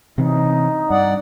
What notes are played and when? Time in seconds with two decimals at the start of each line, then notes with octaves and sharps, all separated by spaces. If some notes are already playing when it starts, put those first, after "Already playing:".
0.18 C3 E3 C4 D#4
0.90 G2 D5 F#5